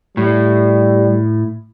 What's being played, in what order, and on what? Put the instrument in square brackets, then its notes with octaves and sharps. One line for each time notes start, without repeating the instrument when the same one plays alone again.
[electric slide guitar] A2 [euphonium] G3